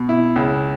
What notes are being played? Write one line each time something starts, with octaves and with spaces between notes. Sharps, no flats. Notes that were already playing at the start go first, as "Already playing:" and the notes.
Already playing: B2
E4
C#2